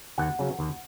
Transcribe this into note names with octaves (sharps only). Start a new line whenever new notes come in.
D#2 F#5
C#3 F#3
D#2